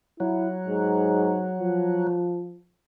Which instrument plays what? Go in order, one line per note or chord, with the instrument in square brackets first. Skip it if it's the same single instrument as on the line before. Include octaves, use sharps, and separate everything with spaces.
[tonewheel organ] F#3 [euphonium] E4
[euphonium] G#2
F3